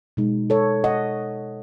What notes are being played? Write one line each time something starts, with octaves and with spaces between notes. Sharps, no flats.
B2 G#3 D#4
A4 C#5
D#5 F#5